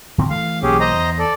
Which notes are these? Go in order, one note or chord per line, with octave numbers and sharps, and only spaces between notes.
A2 D3 C4
E3 A3 F5
B1 E3 A#3 C#4 G4 G#4
C5 D#5 A#5
E2
A4 D5